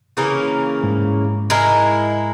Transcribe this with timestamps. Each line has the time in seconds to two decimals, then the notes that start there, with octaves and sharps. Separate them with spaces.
0.17 C#3 E3 A#3 C#4
0.83 G#2
1.50 G#3 E4 A#4